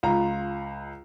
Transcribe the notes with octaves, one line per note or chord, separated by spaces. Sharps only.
C#2 F4 A#5